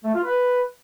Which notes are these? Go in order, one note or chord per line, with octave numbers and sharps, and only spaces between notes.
A3
F4
B4